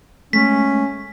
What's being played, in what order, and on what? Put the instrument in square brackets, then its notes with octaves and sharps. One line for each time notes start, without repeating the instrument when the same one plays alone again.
[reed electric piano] G#3 A3 [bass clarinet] C#4 [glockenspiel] B6